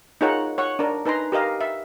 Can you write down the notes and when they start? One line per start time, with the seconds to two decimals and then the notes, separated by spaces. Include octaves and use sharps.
0.21 D#4 F4 G#4 A#4 C#5 F#5
0.58 C#5 F#5 C#6
0.79 D4 A#4
1.05 D#4 B4 G#5 A#5 C6
1.32 G4 A#4 D#5 F5
1.61 E5